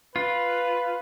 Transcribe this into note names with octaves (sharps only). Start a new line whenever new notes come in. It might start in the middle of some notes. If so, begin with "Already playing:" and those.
F4 B4